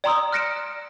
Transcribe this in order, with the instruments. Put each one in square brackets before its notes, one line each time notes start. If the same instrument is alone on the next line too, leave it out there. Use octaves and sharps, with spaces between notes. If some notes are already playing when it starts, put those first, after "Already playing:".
[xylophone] D5 G5 A#5 C6 D#6 E6
F6 F#6 A#6 C#7 D7 E7